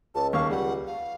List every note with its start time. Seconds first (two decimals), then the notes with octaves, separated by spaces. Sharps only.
0.15 C#2 A5
0.33 D#2 F5 C#6
0.51 G3 F#5
0.87 F5